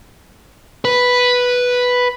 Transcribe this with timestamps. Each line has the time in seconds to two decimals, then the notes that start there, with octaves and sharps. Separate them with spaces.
0.85 B4